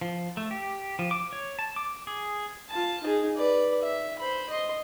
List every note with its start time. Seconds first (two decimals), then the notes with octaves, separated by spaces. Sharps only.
0.01 F3
0.37 A3
0.51 G4
0.99 F3
1.11 D6
1.33 C#5
1.59 A5
1.76 D6
2.07 G#4
2.70 F4 A5
3.03 D#4 G#4
3.36 B4 D5
3.82 E5
4.19 C5 B5
4.50 D#5 C6